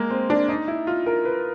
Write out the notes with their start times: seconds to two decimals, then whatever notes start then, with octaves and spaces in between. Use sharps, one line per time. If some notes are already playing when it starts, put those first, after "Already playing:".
Already playing: G#3 A#3
0.10 C4
0.30 D4
0.49 D#4
0.68 E4
0.87 F4
1.06 A#4
1.25 B4